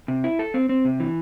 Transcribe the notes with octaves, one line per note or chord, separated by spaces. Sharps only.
C3
E4
A4
C4
C4
C3
E3